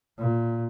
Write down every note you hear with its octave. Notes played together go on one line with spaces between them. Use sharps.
A#2